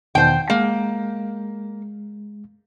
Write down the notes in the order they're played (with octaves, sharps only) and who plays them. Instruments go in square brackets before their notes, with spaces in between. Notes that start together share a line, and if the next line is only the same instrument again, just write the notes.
[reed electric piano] E2 B2 D#3 [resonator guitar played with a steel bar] C5 G5
[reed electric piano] G#3 [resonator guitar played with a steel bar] A#3